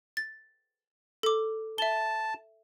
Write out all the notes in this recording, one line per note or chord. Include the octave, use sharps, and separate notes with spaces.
A6
A4 D6
E5 A5 G7